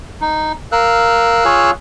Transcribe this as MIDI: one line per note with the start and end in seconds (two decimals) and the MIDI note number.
0.21 0.52 63
0.72 1.44 70
0.72 1.70 77
0.72 1.70 88
0.72 1.70 90
1.45 1.71 65
1.45 1.71 68
1.45 1.71 73